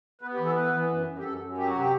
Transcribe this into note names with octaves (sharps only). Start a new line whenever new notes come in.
B3 B4
G4
E3
A4
B3 B4
E3
F#2
F#2
G4
F#2 A4
F#2
F#3 G4
F#4
C3 G4